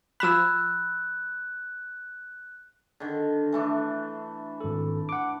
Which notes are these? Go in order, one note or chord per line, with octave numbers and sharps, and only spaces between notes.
F3 B5 E6 F#6 G#6 E7
D3 D#3
E3 A3 D4
G#1 A4
F#5 D6